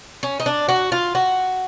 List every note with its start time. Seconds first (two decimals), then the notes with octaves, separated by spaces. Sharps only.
0.23 C#4
0.40 D#4
0.46 D4
0.69 F#4
0.92 F4
1.15 F#4